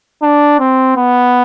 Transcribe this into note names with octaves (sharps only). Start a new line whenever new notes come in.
D4
C4
B3